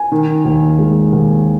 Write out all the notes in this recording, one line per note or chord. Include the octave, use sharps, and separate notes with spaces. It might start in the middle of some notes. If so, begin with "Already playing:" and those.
Already playing: G#5
D#3
D#2
G#3
D#2